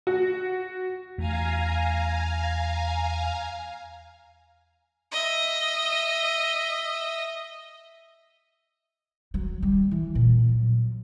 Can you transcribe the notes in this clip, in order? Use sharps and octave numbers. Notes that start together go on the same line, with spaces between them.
F#4
E2 A3 F5 G#5 A#5
D#5 E5
F#3
G3
E3
A#2
F#3